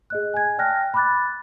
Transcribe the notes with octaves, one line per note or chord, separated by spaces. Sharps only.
G#4 D#5 F#6
G#5 G#6
D5 G5 A5 F6 F#6 A#6
B5 D6 F#6 A6